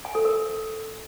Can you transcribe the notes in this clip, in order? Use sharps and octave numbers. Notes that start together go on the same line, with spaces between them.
G#5
A4
A#4